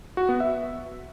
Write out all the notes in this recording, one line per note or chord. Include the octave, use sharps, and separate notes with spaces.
F#4
B3
E5